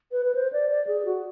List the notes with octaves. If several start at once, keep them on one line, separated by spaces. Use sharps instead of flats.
B4
B4
C5
D5
D5
G#4
F#4